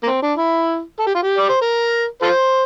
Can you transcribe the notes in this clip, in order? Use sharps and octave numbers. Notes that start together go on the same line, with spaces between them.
A#3
C4
D4
E4
A4
G4
F4
G4
D5
C5
A#4
F4 A4 C5